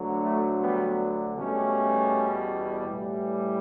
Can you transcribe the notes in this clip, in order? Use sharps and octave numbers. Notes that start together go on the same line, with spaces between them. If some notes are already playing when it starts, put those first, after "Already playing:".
Already playing: D2 D3 F#3
A3
G3 B3
E2 B2 G3 A3 C#4
A2 E3 G3